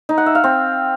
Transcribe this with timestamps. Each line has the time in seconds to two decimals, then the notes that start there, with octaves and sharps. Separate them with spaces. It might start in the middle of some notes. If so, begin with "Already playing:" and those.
0.09 D#4
0.18 F#5
0.26 E5
0.35 F5
0.44 C4